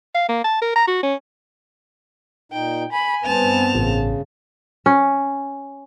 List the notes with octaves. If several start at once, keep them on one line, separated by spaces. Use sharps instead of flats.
F5
A#3
A5
A#4
A#5
F#4
C#4
A#2 D#4 G5
G#5 B5
G2 B3 C4 A5 F7
A1 C#3
C#4